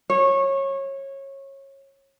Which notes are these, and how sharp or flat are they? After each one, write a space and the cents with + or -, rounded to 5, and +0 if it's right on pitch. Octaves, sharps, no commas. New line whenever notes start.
C#5 -20